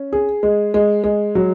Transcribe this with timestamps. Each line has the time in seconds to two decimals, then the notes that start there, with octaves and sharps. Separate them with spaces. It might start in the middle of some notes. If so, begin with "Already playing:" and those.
Already playing: C#4
0.13 G#4
0.43 G#3
0.74 G#3
1.04 G#3
1.35 F#3